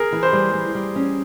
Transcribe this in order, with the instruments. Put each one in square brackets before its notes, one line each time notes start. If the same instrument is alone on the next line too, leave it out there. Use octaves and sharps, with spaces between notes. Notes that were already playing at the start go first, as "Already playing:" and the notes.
Already playing: [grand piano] G#4 A#4
[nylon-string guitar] E3
[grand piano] C5
[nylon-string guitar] G3
G3
G3
C#4